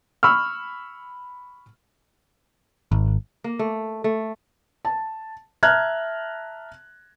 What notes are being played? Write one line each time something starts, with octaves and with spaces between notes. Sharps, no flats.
B5 C#6 E6 F6
G#1
A#3
A3
A3
A5
E5 A5 A#5 F6 F#6 G#6